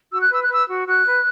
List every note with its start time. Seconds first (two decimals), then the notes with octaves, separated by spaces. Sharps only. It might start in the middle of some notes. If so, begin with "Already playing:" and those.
0.11 F#4 E6
0.21 F#6
0.30 B4 E6
0.42 F#6
0.48 B4 E6
0.68 F#4
0.86 F#4 F#6
1.05 B4